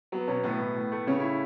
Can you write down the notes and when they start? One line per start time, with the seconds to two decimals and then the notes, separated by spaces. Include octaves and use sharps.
0.12 F#3 B3
0.28 B2 C#4
0.44 A2 B3
0.61 A2
0.76 A2
0.92 A3
1.07 C#3 C#4
1.20 E4